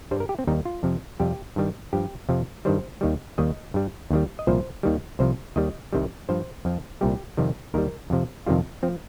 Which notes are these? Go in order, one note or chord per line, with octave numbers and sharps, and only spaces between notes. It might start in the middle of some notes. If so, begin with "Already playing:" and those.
G2 G3 C5
A#4
G4
C4
D#2 D#3 G3 D#4
F4
F2 C3 F3
F2 C3 G3 G4
G2 D#3 G3
G2 F3 G4
F2 C3 F3
G2 D#3 G3 C5
D#2 D#3 G3
D#2 D#3 G3 D#5
G2 G3
D#2 D#3 G3
D#5
C2 A#2 F3 C5
D#2 D#3 G3
C2 C3 F3 C5
D#2 D#3 G3 D#5
C2 C3 D#3 G3
G2 F3 C5
F2 F3
C2 A#2 G3 G4
F2 C3 D#3 G3
D#2 D#3 G3 A#4
F2 C3 F3
F2 C3 D#3 G3 F4
F3 C4